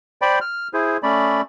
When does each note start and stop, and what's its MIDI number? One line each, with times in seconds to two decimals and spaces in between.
0.22 0.39 72
0.22 0.39 74
0.22 0.39 79
0.22 0.39 83
0.41 0.68 89
0.74 0.97 64
0.74 0.97 68
0.74 0.97 72
1.03 1.41 57
1.03 1.41 61
1.03 1.41 74
1.03 1.41 83